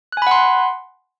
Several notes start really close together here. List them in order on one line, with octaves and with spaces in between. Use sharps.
F#6 G#5 B5 F#5 C6